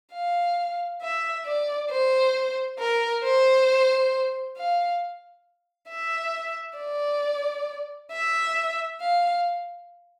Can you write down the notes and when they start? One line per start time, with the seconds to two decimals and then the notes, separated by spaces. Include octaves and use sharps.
0.13 F5
1.02 E5
1.46 D5
1.91 C5
2.79 A#4
3.24 C5
4.57 F5
5.90 E5
6.79 D5
8.12 E5
9.01 F5